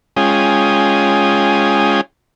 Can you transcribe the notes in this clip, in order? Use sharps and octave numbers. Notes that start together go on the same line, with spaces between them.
G#3 C#4 F4 G5 G#5 D#6